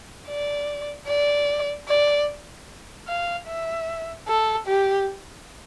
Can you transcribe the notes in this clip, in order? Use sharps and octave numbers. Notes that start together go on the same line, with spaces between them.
D5
D5
D5
F5
E5
A4
G4